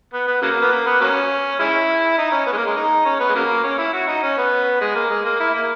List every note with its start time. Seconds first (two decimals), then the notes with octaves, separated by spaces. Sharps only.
0.13 B3
0.27 B3
0.42 C#3 F#3 A#3
0.61 B3
0.71 A#3
0.86 B3
1.01 F#3 A#3 C#4
1.59 G#3 C#4 E4
2.18 D#4
2.32 C#4
2.46 B3
2.52 G#3
2.57 A#3
2.67 G#3
2.76 D#4
3.05 C#4
3.20 B3
3.29 G#3
3.35 C#3 F#3 A#3
3.64 C#4
3.78 E4
3.93 F#4
4.08 D#4
4.23 C#4
4.37 B3
4.81 G#3
4.95 A#3
5.10 G#3
5.25 A#3
5.40 E4
5.54 A#3